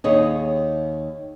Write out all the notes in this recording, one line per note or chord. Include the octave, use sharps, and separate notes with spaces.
D#2 G#4 C#5 D#5